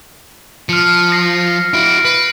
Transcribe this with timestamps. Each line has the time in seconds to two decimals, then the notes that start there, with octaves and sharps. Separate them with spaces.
0.69 F3 F6 C#7
1.12 A#6 C7
1.74 E4 F#4 D7
2.05 B4